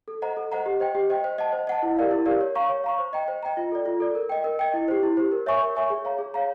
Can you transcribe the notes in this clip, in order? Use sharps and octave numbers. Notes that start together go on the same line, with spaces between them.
A4
C5 D#5 F#5 A#5
A4
C5 D#5 F#5 A#5
G4
C5 D#5 G5
G4
C5 D#5 G5
C5
D#5 F#5 A5
C5
D#5 F#5 A5
E4
G4 A#4 D5 F5
E4
G4 A#4 D5 F5
C#5
F5 A#5 C#6
C#5
F5 A#5 C#6
C5
D#5 G5 A#5
C5
D#5 G5 A#5
F4
A4 D5
F4
A4 D5
A#4
D#5 G5
A#4
D#5 G5
E4
G4 C5
E4
G4 C5
A#4
C#5 E5 G#5 C#6
A#4
C#5 E5 G#5 C#6
G#4
C#5 F5 A#5
G#4
C#5 F5 A#5